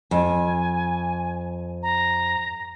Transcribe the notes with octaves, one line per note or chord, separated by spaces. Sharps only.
F2 G#5
A#5